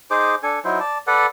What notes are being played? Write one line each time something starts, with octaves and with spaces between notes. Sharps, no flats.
D#4 G#4 C5 D6
D4 A4 G#5
F#3 D#4 E4 C5
D5 A5
A4 B4 D5 F#5